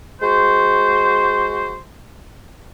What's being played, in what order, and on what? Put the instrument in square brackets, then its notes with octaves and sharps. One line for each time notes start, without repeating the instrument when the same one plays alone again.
[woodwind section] G#3 F#4 C5